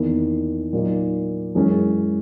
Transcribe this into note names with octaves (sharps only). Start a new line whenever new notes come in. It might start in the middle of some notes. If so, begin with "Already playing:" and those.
Already playing: E2 D#3 A#3
A#2 F#3 A#3 D#4
F#2 E3 G#3 C#4